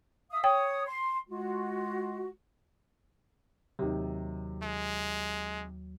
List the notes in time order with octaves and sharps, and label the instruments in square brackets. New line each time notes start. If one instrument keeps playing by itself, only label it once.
[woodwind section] E5 F5 D#6
[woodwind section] C#5 D#6 [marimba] G5
[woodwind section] C6
G#3 F4 F#4
[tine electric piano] D#2 F#3 [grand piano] C3 D#3
[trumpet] G#3